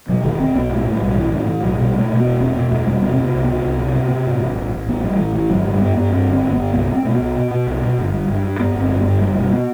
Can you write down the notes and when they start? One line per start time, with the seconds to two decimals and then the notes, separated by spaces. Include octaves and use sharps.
0.09 B2 F#3
0.23 E1 D#3
0.39 E1 C4
0.55 B1 B3
0.70 A2
0.75 A3
0.85 A2
0.95 G3
1.01 B1
1.17 A2 E3
1.32 A2 D#3
1.47 A2 E3
1.63 B1 F#3
1.78 B2 G3
1.94 B2 A3
2.10 B2
2.20 B3
2.25 E1
2.40 E1 C4
2.56 B2 B3
2.71 E2 A3
2.86 E1 G3
3.02 C3 B3
3.13 C3 C4
3.24 B3
3.34 C2
3.44 B3
3.49 C3
3.64 C2
3.79 C3
3.96 C3
4.10 C3
4.27 A2
4.42 A1
4.58 A1
4.72 A1
4.89 A1 B3
5.03 A2 G3
5.19 A1 E3
5.35 A2 E3
5.49 G1 F#3
5.65 G2 G3
5.81 G2 B3
5.96 G2 B3
6.12 G2 C4
6.28 G1
6.33 C4
6.43 G1
6.53 B3
6.58 G1
6.73 C2 B3
6.89 B2
6.95 C4
7.05 B2 A3
7.15 B3
7.20 C2
7.36 B2
7.51 B2
7.67 C2
7.82 B2
7.98 G1
8.13 G2
8.28 G2
8.44 G2
8.59 G2 B3
8.75 G1
8.81 C4
8.90 G2
9.01 B3
9.07 G1
9.21 F#1 G3
9.37 B2 G3
9.53 B3